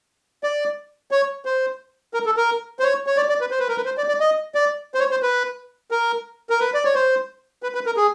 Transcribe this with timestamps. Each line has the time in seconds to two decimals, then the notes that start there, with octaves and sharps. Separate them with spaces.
0.43 D5
1.11 C#5
1.45 C5
2.14 A#4
2.26 A4
2.37 A#4
2.79 C5
2.83 C#5
3.07 C#5
3.17 D5
3.29 D5
3.41 B4
3.51 C5
3.60 B4
3.68 A#4
3.77 B4
3.85 C5
3.97 D5
4.08 D5
4.20 D#5
4.55 D5
4.94 C5
4.99 C#5
5.11 C5
5.22 B4
5.91 A#4
6.50 A#4
6.60 B4
6.74 D5
6.85 C#5
6.95 C5
7.63 B4
7.75 B4
7.86 A#4
7.97 G#4